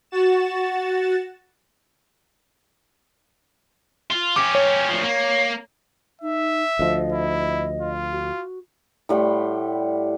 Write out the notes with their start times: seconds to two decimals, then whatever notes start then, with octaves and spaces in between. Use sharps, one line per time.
0.11 F#4 A6 E7
4.10 F4
4.36 C#4 G4 D6
4.55 C#5
4.89 D2 F3
5.04 A#3
6.21 D#4 E5
6.79 D2 F3 D#5
7.12 E4
7.82 F4
8.11 F#4
9.09 A2 G3 F#5 C6